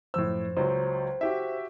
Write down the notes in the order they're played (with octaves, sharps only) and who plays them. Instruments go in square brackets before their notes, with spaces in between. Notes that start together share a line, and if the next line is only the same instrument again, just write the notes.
[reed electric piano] F#2 F3 C5 [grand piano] A2 E6
[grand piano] C#2 F#3 [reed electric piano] C5
[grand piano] F#4 G4 E5